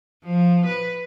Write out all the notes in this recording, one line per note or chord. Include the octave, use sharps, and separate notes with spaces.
F3
B4